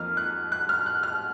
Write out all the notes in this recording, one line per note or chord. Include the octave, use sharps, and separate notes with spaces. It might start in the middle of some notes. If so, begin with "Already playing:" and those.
Already playing: F2 D#3 A#3 D#4 F6
F#6
F#6
F6
F#6
F6